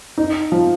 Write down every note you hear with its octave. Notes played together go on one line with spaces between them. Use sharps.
D#4
F3